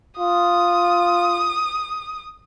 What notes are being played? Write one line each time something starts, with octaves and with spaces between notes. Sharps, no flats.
F4 D#6